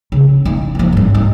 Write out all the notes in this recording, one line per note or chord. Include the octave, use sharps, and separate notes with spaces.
C#3
D#4
D#2 F3
G#1 G2
D#4